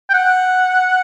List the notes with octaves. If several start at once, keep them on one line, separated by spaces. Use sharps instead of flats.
G5
F#5